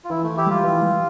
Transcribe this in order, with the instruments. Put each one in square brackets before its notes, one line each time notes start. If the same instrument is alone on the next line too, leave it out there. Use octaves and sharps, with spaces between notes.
[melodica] F4
[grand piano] E3 [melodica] E4
[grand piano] E3 [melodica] A3
[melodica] E4 G4
[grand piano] G3 [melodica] F4
[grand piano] E3
G3